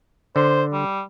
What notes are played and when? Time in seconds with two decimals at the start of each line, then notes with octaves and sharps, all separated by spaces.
0.36 D3 C5
0.73 G3